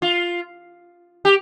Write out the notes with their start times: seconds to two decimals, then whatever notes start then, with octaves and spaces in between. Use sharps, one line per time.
0.02 F4
1.25 G4